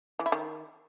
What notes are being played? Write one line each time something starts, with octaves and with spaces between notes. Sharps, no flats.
E3
E4
D#3